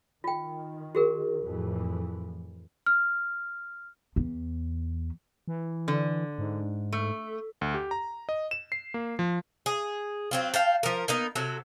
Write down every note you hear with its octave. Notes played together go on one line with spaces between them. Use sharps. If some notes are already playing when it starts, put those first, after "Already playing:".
D#3 F4 G5
F#4 G#4 A#4
F2 A2 E3
F6
E2
E3
D3
G#2
A3
D2
G4
A#5
D#5
E7
C7
A#3
F3
G#4
F#3 C4 F4
F5 G5 A5
F3 A#4
A#3 B3 D#4
C3 F#3 A4